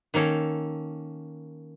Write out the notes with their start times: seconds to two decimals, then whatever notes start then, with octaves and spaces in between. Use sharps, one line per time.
0.14 D#3 A#3 C#4 A4